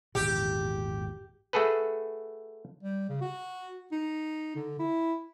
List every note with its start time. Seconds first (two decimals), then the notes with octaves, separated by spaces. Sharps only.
0.15 G#1 E2 A#2 G4
1.53 A3 F#4 G#4 A4 B4
2.83 G3
3.09 C#3
3.21 F#4
3.92 D#4
4.56 D3
4.79 E4